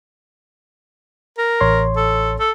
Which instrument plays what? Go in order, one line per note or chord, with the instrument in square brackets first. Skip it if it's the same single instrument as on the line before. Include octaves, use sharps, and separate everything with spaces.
[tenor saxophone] A#4
[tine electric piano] A1 C#5 C6
[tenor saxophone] A4
A4